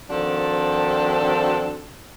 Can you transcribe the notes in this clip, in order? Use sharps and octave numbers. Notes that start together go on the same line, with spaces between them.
D#3 F3 C4 D4 F#4 A4